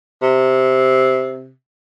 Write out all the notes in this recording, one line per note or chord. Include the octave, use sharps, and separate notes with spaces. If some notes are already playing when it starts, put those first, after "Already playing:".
C3